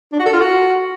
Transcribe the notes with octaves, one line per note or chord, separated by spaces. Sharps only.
D4
F#4
A4
F4
F#4